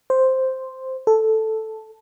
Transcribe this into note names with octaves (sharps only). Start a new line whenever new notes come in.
C5
A4